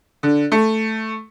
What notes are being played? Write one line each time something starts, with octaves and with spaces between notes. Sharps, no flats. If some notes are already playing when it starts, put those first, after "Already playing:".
D3
A3